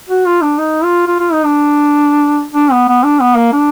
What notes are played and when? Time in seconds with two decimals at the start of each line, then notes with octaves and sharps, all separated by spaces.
0.09 F#4
0.26 F4
0.42 D4
0.58 D#4
0.84 F4
1.07 F4
1.20 F4
1.33 D#4
1.45 D4
2.54 D4
2.72 B3
2.88 B3
3.04 D4
3.21 B3
3.36 A#3
3.53 D4